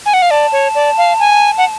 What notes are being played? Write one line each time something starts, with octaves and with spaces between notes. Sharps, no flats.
G#5
F#5
F5
D5 A5
C#5
D5
F5
G#5
F#5